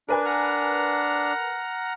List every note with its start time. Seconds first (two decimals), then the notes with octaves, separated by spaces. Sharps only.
0.09 D4 A#4 B4 G#5
0.25 F#5 A#5 F6